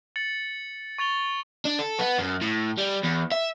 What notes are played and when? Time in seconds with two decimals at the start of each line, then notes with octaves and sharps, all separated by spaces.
0.16 A6 C#7 F#7
0.98 C#6 A6 F7 G7
1.65 D4
1.79 A4
1.99 B3
2.19 F#2
2.42 A2
2.78 G3
3.04 E2
3.32 E5